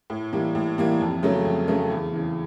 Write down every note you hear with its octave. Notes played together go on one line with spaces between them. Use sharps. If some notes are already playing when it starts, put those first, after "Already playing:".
A2
E3 G3 A#3
A2
E3 G3 A#3
F2
C#3 F#3 A3 C#4
F2
C#3 F#3 A3 C#4
E2
C#3 E3